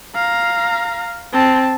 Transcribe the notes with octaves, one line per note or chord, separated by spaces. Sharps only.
F5 A#5
C4 A5